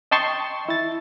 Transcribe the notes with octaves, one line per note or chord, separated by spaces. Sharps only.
D#5 G5 A5 C6 C#6
E4 A6